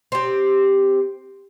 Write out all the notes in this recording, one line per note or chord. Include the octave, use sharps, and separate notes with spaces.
C4 G4